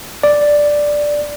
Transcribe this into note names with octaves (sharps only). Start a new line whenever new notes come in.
D5